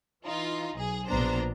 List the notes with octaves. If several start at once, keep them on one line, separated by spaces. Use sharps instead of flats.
E3 D#4 F4
B1 G#4
A#1 B2 B3 D4 C5 A#5